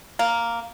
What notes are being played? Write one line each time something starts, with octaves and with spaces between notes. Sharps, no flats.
A#3